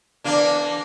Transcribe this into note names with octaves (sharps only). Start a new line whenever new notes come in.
E2 A#3 D4